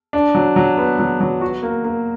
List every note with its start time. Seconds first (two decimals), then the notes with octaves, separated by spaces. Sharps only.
0.13 D4
0.35 F#3
0.56 F#3
0.77 B3
0.99 F#3
1.20 F#3
1.41 F#4
1.63 A#3
1.84 A#3